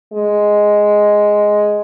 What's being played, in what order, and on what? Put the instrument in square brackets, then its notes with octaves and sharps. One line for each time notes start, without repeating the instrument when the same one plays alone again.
[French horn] G#3